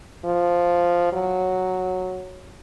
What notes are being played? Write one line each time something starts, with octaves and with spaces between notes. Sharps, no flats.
F3
F#3